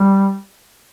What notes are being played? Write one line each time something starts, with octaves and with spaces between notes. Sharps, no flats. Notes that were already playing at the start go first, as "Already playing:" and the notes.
Already playing: G3